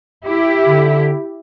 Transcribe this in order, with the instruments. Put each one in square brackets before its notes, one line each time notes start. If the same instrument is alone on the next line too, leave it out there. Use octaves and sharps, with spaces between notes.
[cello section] E4 G4
[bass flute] D3